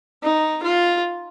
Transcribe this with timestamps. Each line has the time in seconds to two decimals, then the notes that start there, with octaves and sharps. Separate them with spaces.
0.23 D#4
0.63 F4